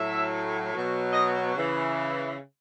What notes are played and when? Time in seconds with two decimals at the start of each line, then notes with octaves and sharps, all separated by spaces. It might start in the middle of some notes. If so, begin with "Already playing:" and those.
Already playing: A2 F#3 E5
0.72 B2 F#3
1.13 D#5
1.56 C#3 E3